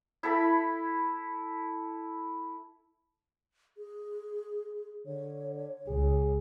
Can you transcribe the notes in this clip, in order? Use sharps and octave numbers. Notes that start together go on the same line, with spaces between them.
E4 A4 B5
G#4
D3 C#5
C#2 G#4